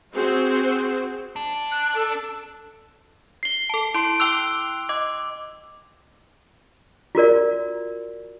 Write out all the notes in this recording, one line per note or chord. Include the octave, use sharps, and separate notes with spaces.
C4 F#4 G#4 C5
D4
F#6
A4
C7 G7
A4 A5
E4 C6 D7
G5 D6 E6 F#6 F7 G7
D#5 D6
F4 F#4 A#4 D5